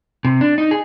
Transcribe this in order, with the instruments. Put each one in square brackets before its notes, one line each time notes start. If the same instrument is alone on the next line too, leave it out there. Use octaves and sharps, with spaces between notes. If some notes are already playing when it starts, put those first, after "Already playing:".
[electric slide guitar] C3
D4
D#4
G#4